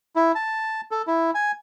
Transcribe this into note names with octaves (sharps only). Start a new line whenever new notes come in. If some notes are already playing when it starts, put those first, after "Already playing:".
E4
A5
A4
E4
G#5